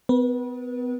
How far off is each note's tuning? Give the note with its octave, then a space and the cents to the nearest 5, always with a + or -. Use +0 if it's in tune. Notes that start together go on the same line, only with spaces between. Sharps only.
B3 +35 B4 -30